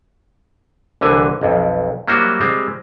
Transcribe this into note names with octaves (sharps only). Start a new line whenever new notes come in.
C2 D3 E3 G#5
B1 F2
F#3 G3 A#3 E4 F#4 C5
G3 G#3 C4